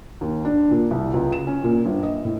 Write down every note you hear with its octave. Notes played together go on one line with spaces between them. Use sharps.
D#2
D4
A#2
C2
C#2
E7
C#4
A#2
G1
D#5
A2